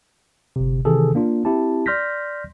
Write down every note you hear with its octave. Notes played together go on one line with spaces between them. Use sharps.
G1 C3
C3 D#3 E3 G#4 A4
A#3 D4 F4
C4 E4 G4 A5
D5 C6 F6 G6 A#6 B6